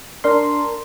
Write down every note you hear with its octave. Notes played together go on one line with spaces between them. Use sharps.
D4 A#4 C6